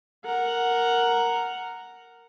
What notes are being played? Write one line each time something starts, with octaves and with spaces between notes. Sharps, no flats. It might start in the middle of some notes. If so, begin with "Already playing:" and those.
A#4 F#5